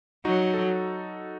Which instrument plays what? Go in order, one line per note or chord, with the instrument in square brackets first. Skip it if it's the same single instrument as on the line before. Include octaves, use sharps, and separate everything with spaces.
[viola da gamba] F#3 [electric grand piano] D#4 F#4
[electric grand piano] A4